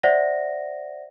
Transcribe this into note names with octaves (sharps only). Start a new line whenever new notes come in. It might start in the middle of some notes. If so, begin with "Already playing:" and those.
C5 D5 E5 F#5 A#6